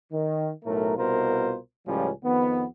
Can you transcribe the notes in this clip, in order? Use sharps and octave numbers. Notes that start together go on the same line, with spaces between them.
D#3
B1 A2 A3 A#4
C2 B2 F4 A#4 C5
C#2 A2 F3 G3 C#4
F2 D#3 B3